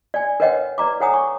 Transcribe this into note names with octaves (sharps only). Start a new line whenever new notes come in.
D5 G#5
A#4 B4 C#5 D#5 F#5 G5
B4 D5 A#5 D6
A4 C#5 F#5 G#5 A#5 D#6
C#6